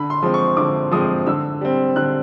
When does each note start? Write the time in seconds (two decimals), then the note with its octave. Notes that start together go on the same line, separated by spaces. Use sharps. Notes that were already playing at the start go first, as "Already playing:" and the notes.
Already playing: D3 B5
0.10 C6
0.23 F3 G#3 C4
0.34 C#6
0.57 D3 D6
0.91 F3 G#3 C4 D#6
1.27 D3 E6
1.61 G3 C4
1.96 D3 F#6